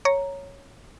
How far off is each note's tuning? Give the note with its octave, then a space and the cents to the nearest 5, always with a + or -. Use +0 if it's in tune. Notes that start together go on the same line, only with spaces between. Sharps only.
C#5 +0 A#5 +0